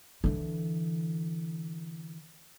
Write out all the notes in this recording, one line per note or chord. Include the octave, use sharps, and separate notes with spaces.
D3 E3